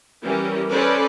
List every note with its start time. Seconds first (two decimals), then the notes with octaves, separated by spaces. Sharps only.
0.22 E3 G3 C#4 G4 A#4
0.69 C#4 A4 B4 C5 D5